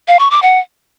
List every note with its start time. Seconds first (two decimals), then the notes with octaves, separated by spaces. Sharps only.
0.08 F5
0.19 C#6
0.31 D6
0.42 F#5